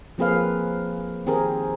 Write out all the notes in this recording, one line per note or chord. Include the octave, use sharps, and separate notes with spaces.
F3 A#3 C4 G#4 B4 F5
D#3 C4 G4 G#4 A#4